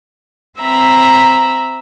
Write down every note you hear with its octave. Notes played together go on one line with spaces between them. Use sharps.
C4 E5 A#5 B5